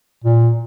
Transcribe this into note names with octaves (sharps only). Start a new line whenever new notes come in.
A#2